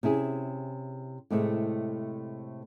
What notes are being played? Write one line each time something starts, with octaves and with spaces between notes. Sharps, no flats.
C3 C#4 E4 G#4
A2 C3 G#3 A3 C4